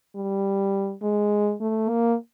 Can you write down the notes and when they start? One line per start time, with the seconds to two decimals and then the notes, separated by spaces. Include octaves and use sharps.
0.16 G3
1.02 G#3
1.61 A3
1.89 A#3